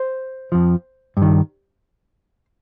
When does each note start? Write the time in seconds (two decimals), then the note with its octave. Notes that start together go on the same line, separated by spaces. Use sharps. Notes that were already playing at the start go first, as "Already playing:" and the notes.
Already playing: C5
0.52 F2 F3
1.17 G2
1.22 D#3